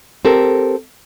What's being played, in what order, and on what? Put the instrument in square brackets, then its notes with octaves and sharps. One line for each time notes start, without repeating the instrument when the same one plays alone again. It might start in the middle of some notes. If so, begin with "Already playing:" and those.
[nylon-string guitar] C4 G4 A4 A#4